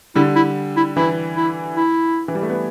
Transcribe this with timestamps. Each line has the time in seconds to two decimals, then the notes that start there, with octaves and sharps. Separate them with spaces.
0.15 D3 G3 E4
0.35 E4
0.76 E4
0.97 E3 E4
1.36 E4
1.76 E4
2.28 E3
2.35 G3
2.42 A3
2.50 B3